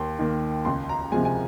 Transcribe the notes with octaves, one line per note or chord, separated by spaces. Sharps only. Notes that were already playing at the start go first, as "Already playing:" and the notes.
Already playing: D#2 C6
D#3 A#3
C#2 C6
A#5
C3 F3 G#3 G#5
G#5